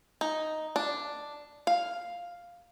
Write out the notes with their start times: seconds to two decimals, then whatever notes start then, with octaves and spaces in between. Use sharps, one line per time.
0.21 D#4
0.76 D4
1.67 F5